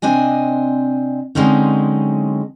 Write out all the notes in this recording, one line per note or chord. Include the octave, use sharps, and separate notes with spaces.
C3 C4 D4 D#5 G#5
D3 F#3 G#3 C4 C#4 D#4